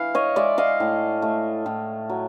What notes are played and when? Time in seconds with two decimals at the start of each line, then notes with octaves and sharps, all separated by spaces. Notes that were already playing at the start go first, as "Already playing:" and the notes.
Already playing: E3 F5
0.15 C#5 D#5
0.36 G#3 D5 E5
0.58 D#5 F5
0.80 A2
1.22 A3
1.66 A2
2.09 F#3